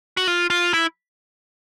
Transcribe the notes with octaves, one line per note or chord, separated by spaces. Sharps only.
F#4
F4
F4
E4